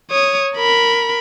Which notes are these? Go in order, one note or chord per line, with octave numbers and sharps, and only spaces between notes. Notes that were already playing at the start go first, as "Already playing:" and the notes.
C#5 D#6
A#4 B5